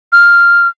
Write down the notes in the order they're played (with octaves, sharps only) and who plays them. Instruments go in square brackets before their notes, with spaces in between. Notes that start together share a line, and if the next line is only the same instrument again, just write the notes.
[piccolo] F6